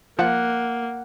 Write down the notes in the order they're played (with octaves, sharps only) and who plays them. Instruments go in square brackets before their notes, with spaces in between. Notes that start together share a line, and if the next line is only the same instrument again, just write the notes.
[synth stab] F3 [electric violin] A#3 [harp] F#5